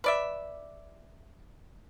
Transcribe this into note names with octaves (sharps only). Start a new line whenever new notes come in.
B4 D5 E5